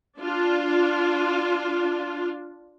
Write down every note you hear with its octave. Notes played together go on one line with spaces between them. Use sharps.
D4 F4